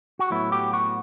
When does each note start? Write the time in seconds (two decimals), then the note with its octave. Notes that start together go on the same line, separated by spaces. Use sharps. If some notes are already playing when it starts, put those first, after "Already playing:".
0.19 F#4
0.30 A2 F#3 B3 E4
0.52 G4
0.73 F#4